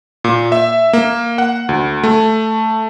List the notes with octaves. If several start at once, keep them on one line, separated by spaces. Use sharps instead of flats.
A#2
E5
A#3
F#5
D2
A3